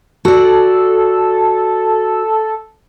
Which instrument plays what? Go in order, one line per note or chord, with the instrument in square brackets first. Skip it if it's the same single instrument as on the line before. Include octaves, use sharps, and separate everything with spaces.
[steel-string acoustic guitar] F#4 D5 [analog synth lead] A4